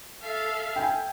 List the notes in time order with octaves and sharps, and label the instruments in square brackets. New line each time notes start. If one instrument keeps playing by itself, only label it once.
[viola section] A4 E5 F5
[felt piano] G5 G#5